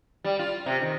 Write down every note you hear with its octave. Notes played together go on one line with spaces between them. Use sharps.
G3
F4
C3
D#3